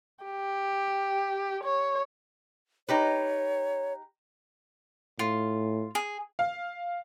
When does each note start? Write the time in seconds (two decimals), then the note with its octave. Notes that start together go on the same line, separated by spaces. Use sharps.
0.24 G4
1.64 C#5
2.88 D#4 G4 B4 C#5
5.19 A2 F4
5.95 G#4
6.39 F5